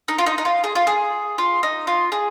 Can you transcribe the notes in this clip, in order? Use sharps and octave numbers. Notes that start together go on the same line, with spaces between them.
D#4
F4
D#4
D#4
F4
G#4
F4
G#4
F4
D#4
F4
G#4